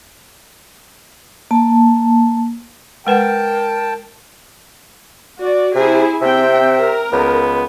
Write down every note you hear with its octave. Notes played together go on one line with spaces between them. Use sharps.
A#3 A5
G#3 A#4 B4 F#5 G5 A5
F#4 D5
C3 E4 G#4 G#5
C3 C4 E5 G5
A#4
C#2 B3